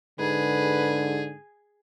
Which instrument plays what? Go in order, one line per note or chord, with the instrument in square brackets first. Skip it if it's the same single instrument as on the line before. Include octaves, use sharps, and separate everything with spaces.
[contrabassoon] G#2 [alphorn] D3 [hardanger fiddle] G#4 [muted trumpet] B4